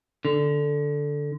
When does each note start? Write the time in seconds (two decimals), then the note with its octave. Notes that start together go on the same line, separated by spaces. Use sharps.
0.25 D3